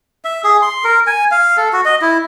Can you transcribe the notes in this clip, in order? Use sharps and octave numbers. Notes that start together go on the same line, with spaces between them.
E5
G#4
C6
A#4
G#5
F5
A4
F#4
D#5
E4